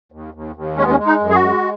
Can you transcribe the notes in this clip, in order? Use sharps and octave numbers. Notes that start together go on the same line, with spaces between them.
D#2
D#2
D#2
G#3 C#4
B3
C#4
G#3
D#4
F#2
G#4
F#4
G#3